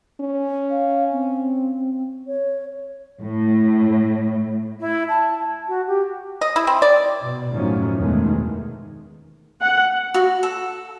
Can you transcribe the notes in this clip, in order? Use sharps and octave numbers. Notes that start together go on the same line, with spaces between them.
C#4
F5
C4
C#5
A2
E4
A5
F#4
G4
D#5
E4
C4
D5
B2
F#2 A2 D#3 F3 F#3 C#4
E2 B2 D#3 E3 G#3 A3
F#5
F#4
A4